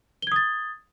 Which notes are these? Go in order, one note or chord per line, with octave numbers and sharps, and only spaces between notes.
D#6 G#6 A6 G7